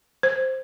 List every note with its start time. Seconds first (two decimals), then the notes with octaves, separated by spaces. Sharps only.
0.23 C5